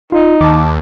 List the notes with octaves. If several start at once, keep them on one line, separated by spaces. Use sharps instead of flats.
D#4 F4
D#2 A5 D6